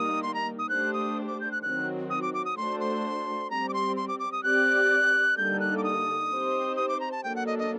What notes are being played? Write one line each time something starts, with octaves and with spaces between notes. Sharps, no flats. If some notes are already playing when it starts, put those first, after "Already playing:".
Already playing: D#3 G3 A#3 D#4 D#6
C6
A#5
D#6
A3 D4 G4 C5 F#6
D#6
D6
G6
F#6
D#3 F#3 C4 F#4 F#6
D#6
D6
D6
D#6
A3 D4 F#4 A4 C5 C6
C6
G3 C4 G4 A#5
D6
C6
C6
D6
D6
D#6
C4 G4 D5 F#6
D3 G3 A#3 D#4 A4 G6
F#6
D6
D#6
C4 D#4 G4 C5
D#6
D6
A#5
A5
F#3 A#3 D4 A4 G5
F#5
D#5
D#5